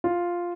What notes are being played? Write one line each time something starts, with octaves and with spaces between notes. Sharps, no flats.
F4